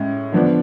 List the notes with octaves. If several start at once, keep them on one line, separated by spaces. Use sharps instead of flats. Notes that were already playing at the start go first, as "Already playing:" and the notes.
Already playing: A2 G#3 C#4
D3 F3 B3 D4